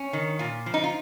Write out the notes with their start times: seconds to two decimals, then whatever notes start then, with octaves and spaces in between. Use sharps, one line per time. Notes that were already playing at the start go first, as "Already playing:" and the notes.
Already playing: C#4
0.13 D#3
0.39 A#2 F4
0.66 F3
0.74 D#4
0.84 F4